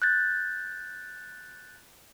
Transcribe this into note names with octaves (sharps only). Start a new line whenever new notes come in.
F#6 G6 A6